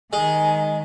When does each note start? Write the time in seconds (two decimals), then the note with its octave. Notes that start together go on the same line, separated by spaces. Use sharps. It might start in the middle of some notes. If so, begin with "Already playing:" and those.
0.13 D#3 G#3 G#5